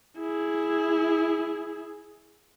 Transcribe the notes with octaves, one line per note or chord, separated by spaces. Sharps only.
E4 G#4